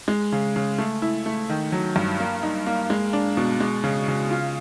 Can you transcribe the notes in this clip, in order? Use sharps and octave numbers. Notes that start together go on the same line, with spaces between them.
G#3
C#3
C#3
A3
E4
A3
D#3
F#3
G2
A#3
D#4
A#3
G#3
D4
B2
G#3
C#3
C#3
F4